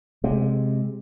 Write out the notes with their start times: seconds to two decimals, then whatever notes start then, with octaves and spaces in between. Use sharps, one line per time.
0.24 C3 G#3